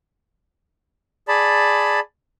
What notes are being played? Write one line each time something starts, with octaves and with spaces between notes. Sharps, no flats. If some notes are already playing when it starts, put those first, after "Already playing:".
G#4 D5 A5 B5